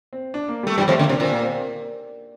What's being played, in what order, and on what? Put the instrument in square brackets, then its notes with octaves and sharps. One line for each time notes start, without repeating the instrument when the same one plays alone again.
[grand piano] C4
D4
A#3
[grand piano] G3 [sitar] A3
[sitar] G2 G3 [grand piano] F3
[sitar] F2 F3 [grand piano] A3
[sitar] D3 [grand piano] A#3
[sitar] C3 [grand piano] D4
[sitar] A#2 [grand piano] C4
[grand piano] A#3
C4
C4